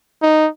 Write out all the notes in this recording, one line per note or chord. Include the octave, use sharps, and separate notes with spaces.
D#4